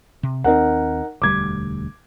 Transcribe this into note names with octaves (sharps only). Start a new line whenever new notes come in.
C3
D#2 C4 D#4 A#4 F#5
E1 D2 G3 D6 G#6